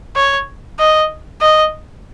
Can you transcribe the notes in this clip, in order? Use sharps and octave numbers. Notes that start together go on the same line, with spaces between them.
C#5
D#5
D#5